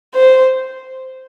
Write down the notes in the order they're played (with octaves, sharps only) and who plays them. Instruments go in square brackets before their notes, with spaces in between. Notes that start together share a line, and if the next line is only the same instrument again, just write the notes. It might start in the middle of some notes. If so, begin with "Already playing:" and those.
[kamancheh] C5